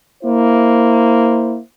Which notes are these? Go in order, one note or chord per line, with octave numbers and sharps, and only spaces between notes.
A#3 E4 C5